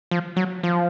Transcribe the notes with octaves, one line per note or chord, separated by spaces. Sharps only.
F3
F#3
F3